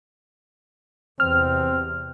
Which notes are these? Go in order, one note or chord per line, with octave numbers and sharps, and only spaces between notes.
E2 C3 C4 F6